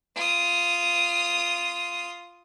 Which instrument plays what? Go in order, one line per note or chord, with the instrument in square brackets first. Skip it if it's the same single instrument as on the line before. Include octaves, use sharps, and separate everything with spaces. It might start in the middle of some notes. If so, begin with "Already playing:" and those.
[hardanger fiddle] F4 D#6